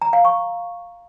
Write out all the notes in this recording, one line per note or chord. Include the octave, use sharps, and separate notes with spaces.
A#5
F5
C#6